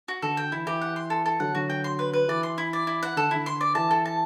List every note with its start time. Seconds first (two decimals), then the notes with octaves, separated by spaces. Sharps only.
0.08 F#4
0.22 D3 A4
0.37 G5
0.52 E3 E4
0.67 E3 G4
0.81 F#5
0.96 C6
1.10 A4
1.26 A4
1.40 D3 F#3 F#5
1.55 D3 F#3 F#4
1.70 G5
1.84 C6
1.99 B4
2.13 B4
2.28 E3 D5
2.43 C6
2.58 E4
2.73 D5
2.87 E4
3.03 F#5
3.16 D3 A4
3.31 D3 E4
3.46 C6
3.61 D5
3.75 E3 A5
3.91 A4
4.06 A5